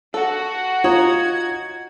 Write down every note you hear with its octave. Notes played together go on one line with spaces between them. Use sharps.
F#4 A4
D#4 F4 C#5 G#6